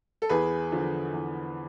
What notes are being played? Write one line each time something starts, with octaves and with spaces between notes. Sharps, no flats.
A4
E2 G#4 B4
D3 F3
E2